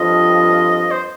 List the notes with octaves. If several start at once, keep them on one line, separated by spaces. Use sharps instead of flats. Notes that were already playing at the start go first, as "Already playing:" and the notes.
Already playing: G2 F3 C4 F4 A4 D#5
C5